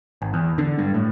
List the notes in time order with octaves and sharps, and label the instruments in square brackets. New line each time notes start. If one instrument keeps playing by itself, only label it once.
[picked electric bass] G#1
E2
D3
G2
A2